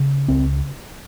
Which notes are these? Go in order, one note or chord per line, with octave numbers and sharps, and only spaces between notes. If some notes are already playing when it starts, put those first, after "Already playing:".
Already playing: C#3
C#2 C4